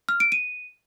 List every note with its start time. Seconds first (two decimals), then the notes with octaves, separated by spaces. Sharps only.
0.09 F6
0.20 D7
0.32 D#7